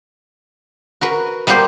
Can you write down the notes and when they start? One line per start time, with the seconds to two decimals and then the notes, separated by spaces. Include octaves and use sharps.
1.01 F#4 A#4 B4
1.47 G3 A#3 B3 G4 C5